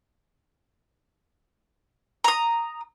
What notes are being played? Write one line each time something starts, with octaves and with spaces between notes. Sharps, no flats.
A#5 D#6